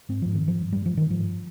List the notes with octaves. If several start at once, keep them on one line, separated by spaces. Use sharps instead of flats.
G#2 C4
G#2 F3
D#3
G#2
F3
G2
G2 G3
F3
G2 D#3
G#2 F3